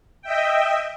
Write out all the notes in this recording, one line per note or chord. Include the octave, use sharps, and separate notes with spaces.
D#5 E5 G5